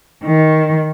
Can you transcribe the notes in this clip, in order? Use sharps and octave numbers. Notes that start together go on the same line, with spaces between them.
D#3